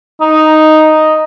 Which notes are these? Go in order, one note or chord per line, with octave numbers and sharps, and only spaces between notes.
D#4